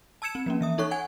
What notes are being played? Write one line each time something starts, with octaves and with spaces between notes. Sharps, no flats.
A5 E6 G#6 C#7 E7
C4
F3 A#3 C#4
E3 E5 D#6
D#4 A4 C#5 C#6 F#6
F#5 G#5 G#6